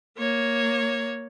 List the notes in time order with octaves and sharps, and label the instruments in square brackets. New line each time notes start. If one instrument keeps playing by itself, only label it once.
[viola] A#3 C#5